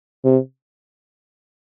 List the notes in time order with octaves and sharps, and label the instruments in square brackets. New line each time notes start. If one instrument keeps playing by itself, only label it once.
[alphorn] C3